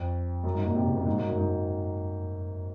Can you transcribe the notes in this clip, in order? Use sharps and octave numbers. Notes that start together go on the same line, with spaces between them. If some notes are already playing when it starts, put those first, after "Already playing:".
Already playing: F2
F#2
G#2
A#2
C3
C#3
A#2
G#2
F#2
F#2
G#2